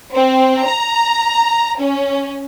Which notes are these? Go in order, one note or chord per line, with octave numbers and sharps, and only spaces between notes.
C4
A#5
C#4